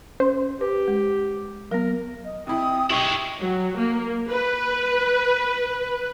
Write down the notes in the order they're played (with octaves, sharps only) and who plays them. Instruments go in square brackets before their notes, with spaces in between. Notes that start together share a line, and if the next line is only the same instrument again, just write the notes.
[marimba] C#4 [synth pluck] C5
[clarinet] G4 [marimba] B4
[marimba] G#3
[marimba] F#3 B3 [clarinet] A#4
[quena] D#5
[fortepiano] C3 E4 [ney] G5 [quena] D#6
[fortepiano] B1 D#4 G4 [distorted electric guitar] G#3 E4 [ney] G5 [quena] C#6
[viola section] F#3
A#3
B4